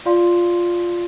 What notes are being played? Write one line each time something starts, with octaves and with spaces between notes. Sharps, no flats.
F4 D5 F5 C6